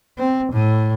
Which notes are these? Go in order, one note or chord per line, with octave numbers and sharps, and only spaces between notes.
C4
A2